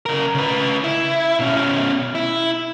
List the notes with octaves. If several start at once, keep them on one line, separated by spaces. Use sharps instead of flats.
C#3 A#4
C#3 B4
E4
B2 C#4
E4